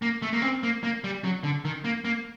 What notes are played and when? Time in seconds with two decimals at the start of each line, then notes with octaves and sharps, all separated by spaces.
0.02 A#3
0.22 A3
0.33 A#3
0.42 C4
0.63 A#3
0.83 A#3
1.04 G3
1.24 F#3
1.43 D3
1.65 D#3
1.84 A#3
2.05 A#3